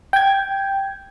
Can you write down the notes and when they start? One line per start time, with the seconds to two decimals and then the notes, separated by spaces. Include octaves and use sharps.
0.13 G5 G#6